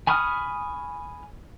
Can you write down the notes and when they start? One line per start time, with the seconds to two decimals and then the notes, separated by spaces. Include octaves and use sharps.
0.07 G#5 B5 C#6 D#6 F6